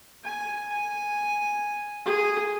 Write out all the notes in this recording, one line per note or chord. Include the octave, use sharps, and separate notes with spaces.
G#5
G#5
G#4